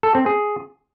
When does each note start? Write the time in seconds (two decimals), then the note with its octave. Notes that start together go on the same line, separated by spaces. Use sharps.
0.03 A4
0.15 C4
0.26 G#4